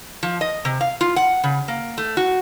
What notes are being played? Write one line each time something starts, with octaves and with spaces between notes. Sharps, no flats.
F3
D#5
C3
F5
F4
F#5
C#3
A#3
A3
F#4